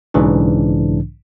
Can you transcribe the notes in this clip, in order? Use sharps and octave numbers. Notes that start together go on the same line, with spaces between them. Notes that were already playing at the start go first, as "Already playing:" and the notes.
B1 G#2 C#3 E3 D4